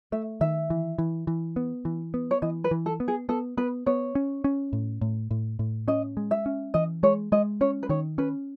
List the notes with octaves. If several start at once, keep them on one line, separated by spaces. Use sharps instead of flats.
A3 E5
D#3 E5
E3
E3
E3
B3
E3
B3
C#5
E3 D#5
B4
E3
A4
B3
G#4
B3 A4
B3 B4
B3 C#5
C#4
C#4
A2
A2
A2
A2
C#4 D#5
G#3
E5
C#4
E3 D#5
G#3 C#5
G#3 D#5
C#4 C#5
B4
D#3 C#5
C#4 B4